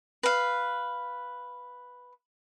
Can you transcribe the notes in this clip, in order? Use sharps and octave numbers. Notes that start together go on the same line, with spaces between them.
B4 F5